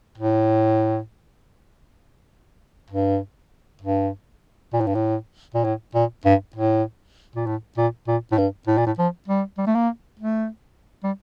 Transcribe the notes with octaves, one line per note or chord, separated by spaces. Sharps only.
A2
G2
G2
A#2
A2
G2
A2
A#2
A2
A#2
G2
A2
A#2
A2
A#2
A#2
A2
G2
A2
A#2
A2
F3
G3
G3
A3
A#3
A3
G3